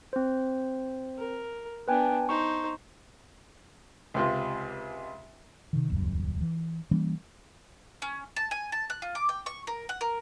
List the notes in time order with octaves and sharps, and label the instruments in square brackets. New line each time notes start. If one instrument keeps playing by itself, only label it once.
[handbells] C4 C5
[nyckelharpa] A#4
[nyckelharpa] B3 D4 [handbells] B4 G5 G#5
[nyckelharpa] D#4 C5 [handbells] C#6
[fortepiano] C#2 C3 F4
[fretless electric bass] C3 D#3
D#1 C#2 F#2
E3
E3 G3 A#3 C#4
[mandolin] C#4
A5
G#5
A5
F#6
F4
D6
G5
C#6
A#4
F#5
A#4